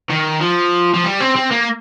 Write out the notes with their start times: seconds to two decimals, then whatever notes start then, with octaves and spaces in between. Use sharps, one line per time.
0.09 D#3
0.41 F3
0.94 F3
1.04 G3
1.20 C4
1.36 C4
1.51 A#3